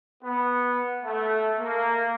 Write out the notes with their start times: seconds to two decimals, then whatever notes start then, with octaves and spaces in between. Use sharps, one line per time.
0.23 B3
1.04 A3
1.59 A#3